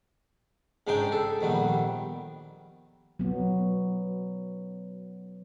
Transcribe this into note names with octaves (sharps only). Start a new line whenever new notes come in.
G#2 C#3 D4 D#4 G#4 G5
A4
A#1 D#3 G3 B3
F#3 B3